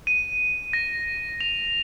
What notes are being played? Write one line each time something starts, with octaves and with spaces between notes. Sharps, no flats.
D#7
A#6
F7